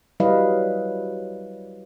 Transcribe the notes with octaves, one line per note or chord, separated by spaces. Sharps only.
F#3 G3 E4 B4 D#5 F5